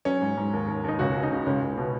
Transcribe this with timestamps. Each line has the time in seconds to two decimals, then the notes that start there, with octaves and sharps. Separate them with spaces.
0.05 F#3 C#4
0.22 G#2
0.37 G#2
0.53 D#2
0.68 D#2
0.84 D#2 D#4
0.99 C#2 C#4 F#4
1.16 C#3
1.23 D#4
1.31 C#3
1.46 C#2 C#4
1.62 C#2
1.78 B2